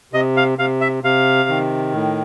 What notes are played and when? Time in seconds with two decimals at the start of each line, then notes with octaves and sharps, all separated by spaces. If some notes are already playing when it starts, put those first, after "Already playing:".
0.13 C3 D#5
0.37 F5
0.58 C3 F5
0.81 E5
1.04 C3 F5
1.49 D#3
1.93 A2